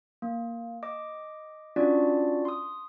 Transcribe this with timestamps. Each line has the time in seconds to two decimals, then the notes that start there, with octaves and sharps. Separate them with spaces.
0.22 A#3
0.83 D#5 D6
1.76 C#4 D4 F4 F#4 D5
2.45 C6 D#6